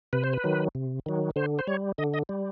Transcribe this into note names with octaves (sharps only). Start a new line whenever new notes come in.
C3 B4
C5
B4
D#3 F#3
C3
D#3 F#3
D3 C5
C5
G3 C#5
D3 D#5
D#5
G3